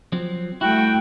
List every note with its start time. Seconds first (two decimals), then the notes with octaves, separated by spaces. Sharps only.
0.12 F3 F#3 C4
0.61 G3 A3 E4 F#4 G5